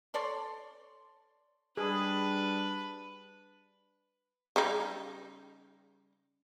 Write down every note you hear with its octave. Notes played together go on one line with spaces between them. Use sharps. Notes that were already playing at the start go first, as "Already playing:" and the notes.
A4 C#5 D5 C6
G3 D4 G#4 B4
C#3 G3 D#4